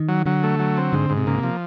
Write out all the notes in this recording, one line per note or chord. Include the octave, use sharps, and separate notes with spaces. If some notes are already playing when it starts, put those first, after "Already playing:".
Already playing: D#3
F#3
D3 F#3
A3
F#3
C4
G#2 D3
G#2
C3
C#3 A#3
C3
F3